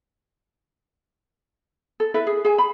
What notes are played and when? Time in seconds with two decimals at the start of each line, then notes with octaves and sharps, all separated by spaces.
2.00 A4
2.14 E4 A4 B4 E5
2.27 G#4
2.45 G#4 G#5
2.58 B5